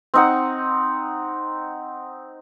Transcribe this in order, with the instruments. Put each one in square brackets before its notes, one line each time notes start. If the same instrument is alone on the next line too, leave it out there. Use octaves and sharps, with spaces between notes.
[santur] C4 D#4 F#5